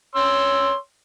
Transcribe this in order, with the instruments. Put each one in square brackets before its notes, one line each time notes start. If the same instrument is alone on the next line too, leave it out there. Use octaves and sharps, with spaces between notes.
[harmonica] C#5 C6 E6